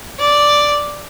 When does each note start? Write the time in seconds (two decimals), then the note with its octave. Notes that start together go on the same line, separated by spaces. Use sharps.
0.19 D5